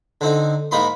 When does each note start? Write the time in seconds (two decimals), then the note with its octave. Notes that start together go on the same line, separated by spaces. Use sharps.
0.21 D3 C4 D#4
0.71 G#2 A#3 D#4 B5 C6